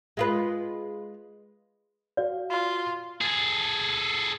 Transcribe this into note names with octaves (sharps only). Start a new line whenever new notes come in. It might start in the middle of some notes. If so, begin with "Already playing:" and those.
G#3 F4 B4
F#4 D5 F5
F4
G#4 A4